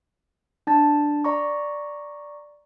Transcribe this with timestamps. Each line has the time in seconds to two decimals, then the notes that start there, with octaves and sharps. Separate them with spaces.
0.67 D4 A5 A6
1.24 D5 A#5 C#6